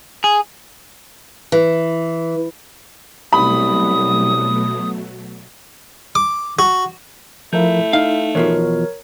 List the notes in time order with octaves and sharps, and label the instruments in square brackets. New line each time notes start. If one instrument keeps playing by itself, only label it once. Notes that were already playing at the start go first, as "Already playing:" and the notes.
[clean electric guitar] G#4
[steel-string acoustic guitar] E3
[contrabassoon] C2 [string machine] B2 F#3 A3 [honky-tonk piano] B5 [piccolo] D#6
[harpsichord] D6
F#4
[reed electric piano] F3 F4 A#4 [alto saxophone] A3 [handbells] E4 E5 G6
[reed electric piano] D#4 [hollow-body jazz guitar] F5
[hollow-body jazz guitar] E2 B2 F3 [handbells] A#4 C#5